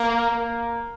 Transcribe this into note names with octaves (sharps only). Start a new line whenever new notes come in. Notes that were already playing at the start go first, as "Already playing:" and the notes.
Already playing: A#3
A#3